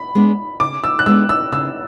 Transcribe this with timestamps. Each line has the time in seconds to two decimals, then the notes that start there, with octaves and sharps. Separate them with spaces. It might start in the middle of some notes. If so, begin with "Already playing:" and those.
Already playing: B5
0.15 G#3 B3 D4
0.60 C#3 D6
0.84 E6
0.99 F#6
1.06 G#3 B3 D4 E6
1.29 E6
1.52 C#3 E6